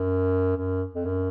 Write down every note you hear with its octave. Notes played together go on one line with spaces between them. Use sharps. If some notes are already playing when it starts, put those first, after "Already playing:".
Already playing: F#2
F#2
F2
F#2